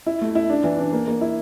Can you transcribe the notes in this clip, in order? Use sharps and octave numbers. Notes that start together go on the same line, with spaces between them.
E4
A3
E4
D4
E3
D4
A#3
A#3
E4